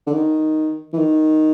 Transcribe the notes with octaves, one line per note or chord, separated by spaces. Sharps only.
D3
D#3
E3
D#3